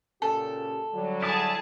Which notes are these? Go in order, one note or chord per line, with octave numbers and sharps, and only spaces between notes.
A#2 C#3 G4 A4
D3 F#3 G3
E4 G#4 A5 D#6